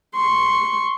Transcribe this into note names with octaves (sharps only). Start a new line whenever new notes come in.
C6 C#6